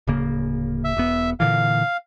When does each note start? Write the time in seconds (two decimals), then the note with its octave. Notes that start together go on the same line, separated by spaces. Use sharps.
0.07 D1 C#3 A#3
0.84 E5
0.97 E1 B3
1.40 A#2 D3 E3 F5